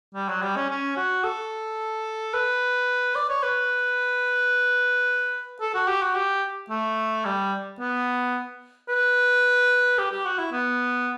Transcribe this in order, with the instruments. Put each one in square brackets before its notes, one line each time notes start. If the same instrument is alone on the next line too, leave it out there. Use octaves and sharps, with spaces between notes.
[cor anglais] G3
F#3
G3
C#4
C#4
F#4
A4
B4
D5
C#5
B4
A4
F#4
G4
F#4
G4
A3
G3
B3
B4
G4
G4
F#4
E4
B3